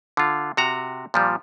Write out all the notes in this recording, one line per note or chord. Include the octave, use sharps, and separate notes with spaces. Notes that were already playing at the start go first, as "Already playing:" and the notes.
D3 F4
C3 F#4 A#5
A#2 F3 G3